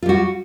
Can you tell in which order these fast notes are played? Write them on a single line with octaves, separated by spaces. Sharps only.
F4 G3 F#4